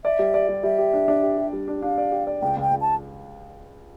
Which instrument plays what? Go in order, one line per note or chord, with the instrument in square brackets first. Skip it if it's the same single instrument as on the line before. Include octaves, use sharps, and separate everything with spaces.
[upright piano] D5 [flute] E5
[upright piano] G3
D5
G3
[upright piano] G3 [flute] E5
[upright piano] G4
D4
D4
G4
G4
G3
D4
[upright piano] D4 [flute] F5
[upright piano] D5
G4
D5
[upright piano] C#2 [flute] G5
[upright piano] C#2 [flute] G5
[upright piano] C#2
[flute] A5